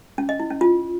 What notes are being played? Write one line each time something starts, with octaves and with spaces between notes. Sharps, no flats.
C#4
D#5
E4
C#4
F4